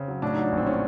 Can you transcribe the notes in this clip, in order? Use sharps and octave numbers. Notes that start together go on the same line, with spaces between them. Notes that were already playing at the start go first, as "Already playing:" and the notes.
Already playing: C#3 C4
F#3
A2 D4
D#4
F#3
D4
A#1
C4
C#4